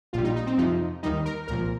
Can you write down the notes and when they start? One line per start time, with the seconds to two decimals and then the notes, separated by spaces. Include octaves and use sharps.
0.13 A#1 A#2 G3 F4
0.24 D#4
0.36 D#4
0.47 C4
0.58 F2 C3 F3 D#4
1.03 D#2 D#3 G3 D#4
1.25 A#4
1.47 C2 A#2 F3 A#4